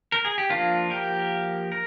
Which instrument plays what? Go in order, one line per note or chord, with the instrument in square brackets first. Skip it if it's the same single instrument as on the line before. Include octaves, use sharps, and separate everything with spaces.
[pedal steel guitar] A#4
G#4
G4
F3 A#3 D4 F4
G4 A#4
A#4